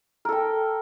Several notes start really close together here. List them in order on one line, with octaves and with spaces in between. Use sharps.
A#4 A4 G5